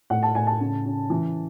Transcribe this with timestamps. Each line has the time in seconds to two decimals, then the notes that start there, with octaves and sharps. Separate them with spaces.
0.10 A2 F#5
0.23 A5
0.35 A2 G#5
0.47 A5
0.61 C#3
0.86 C#3
1.10 E3